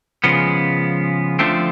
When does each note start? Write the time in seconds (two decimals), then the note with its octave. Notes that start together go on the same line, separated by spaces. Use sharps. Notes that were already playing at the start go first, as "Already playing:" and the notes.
0.24 C#3 F3 G#3 B3
1.39 D3 F3 A3 C4